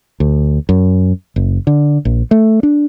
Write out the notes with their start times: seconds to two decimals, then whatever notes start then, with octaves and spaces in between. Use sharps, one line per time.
0.20 D2
0.69 F#2
1.36 F#1
1.67 D3
2.05 A#1
2.31 A3
2.63 D4